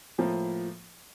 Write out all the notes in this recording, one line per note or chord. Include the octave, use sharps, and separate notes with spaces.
A2 F3 A#3